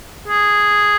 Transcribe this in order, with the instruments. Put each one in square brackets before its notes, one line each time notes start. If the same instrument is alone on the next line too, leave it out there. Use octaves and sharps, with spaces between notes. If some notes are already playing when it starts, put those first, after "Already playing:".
[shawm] G#4